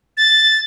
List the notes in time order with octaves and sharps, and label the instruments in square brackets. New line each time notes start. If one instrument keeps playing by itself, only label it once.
[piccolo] A6